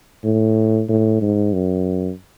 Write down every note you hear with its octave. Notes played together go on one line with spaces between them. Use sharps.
A2
A2
G#2
F#2